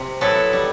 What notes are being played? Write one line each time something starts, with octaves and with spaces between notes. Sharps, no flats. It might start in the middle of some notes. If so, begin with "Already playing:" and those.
Already playing: C3
F#3 B3 E4 A4
G3